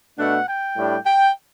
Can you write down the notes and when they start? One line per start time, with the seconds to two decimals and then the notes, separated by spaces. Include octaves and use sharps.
0.18 B2 A3 D4 F#5
0.47 G5
0.76 A2 G3 D4
1.06 G5